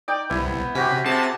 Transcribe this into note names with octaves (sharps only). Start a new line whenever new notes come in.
D#4 D5 G5
C2 B3 E4
C3 C#4 F#4 G4 B6
C3 G#4 A5